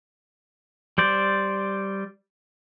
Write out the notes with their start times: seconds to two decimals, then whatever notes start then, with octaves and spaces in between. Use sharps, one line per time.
0.98 G3 C5 D5